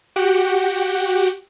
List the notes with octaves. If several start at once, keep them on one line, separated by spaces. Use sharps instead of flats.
F#4 G4 F#5 G5